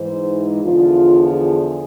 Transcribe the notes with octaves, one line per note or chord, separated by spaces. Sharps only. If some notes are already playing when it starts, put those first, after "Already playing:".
Already playing: G#2 E3 C5
E2 D3 F3 F4
G#4